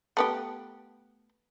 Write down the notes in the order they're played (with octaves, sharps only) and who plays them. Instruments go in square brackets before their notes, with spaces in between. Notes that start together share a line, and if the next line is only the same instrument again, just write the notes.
[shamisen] A3 B3 G4